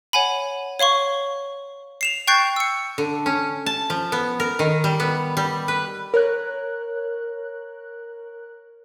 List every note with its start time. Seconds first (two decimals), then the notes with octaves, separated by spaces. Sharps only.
0.13 C#5 F#5 G#5 B5
0.79 C#5 F5 C6 C#6
2.01 C7 E7 F7
2.27 G5 C#6 F#6 G6 A6 C7
2.56 E6 C#7
2.98 D3
3.26 C#4
3.66 A5
3.90 F3
4.12 B3
4.40 A#4
4.59 D#3
4.84 G3
5.00 B3
5.37 G3
5.68 B4
6.14 A#4 C#5 F#6